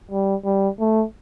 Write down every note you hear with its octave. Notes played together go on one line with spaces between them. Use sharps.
G3
G3
A3